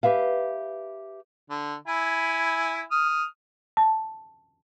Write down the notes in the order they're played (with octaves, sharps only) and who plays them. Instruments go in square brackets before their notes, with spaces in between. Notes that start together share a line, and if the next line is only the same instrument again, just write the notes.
[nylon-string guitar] G4 G#4 B4 E5 F5
[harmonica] D3
E4 G#5 B5
D#6 F6
[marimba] A5